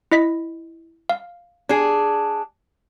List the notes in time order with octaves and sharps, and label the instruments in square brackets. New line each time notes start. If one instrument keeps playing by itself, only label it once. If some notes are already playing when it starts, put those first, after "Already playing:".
[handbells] E4 D#5 B6
F5
[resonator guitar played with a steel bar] D4 G#4